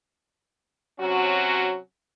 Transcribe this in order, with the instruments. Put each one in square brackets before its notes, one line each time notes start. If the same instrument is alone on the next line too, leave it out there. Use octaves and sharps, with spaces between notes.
[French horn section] C3 F#3 C#4 F#4